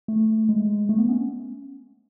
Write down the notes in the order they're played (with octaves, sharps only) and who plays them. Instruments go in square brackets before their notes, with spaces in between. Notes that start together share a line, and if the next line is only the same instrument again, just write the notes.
[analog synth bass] A3
G#3
A3
B3
C#4